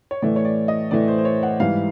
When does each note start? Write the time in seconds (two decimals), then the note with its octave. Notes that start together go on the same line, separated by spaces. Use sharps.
0.11 C#5
0.22 A2 E3 A3 D5
0.36 C#5
0.45 D5
0.68 D#5
0.91 A2 E3 A3 D5
1.08 C5
1.18 C5
1.25 C#5
1.43 F#5
1.60 G#2 E3 G3 F5